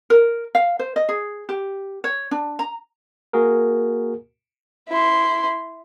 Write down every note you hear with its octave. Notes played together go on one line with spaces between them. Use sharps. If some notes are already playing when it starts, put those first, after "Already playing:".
A#4
F5
C5
D#5
G#4
G4
C#5
D4
A#5
A#3 F#4 G#4 A#4
E4 C6